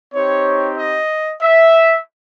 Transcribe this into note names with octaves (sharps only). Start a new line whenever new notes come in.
C4 D#4 G4 C#5
D#5
E5